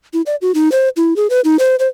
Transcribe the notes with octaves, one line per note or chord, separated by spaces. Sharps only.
E4
D5
F#4
D#4
C5
E4
G#4
B4
D#4
C5
C5